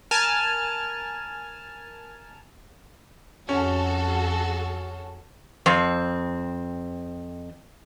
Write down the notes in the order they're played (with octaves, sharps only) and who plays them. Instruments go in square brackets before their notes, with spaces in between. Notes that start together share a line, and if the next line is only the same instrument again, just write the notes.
[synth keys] A#4 G#5 A5 F6
[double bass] F2 [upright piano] C#4 [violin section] F#4 G#4 A4
[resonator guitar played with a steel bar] F2 C4